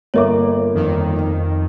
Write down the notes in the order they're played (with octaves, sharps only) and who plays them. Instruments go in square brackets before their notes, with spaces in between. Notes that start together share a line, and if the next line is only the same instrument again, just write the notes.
[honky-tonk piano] G1 A#3 D6 [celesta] C#5 D#5 E5
[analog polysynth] F2 D#3